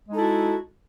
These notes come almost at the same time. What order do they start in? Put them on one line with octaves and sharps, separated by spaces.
G#3 D#4 A4 E4 F#4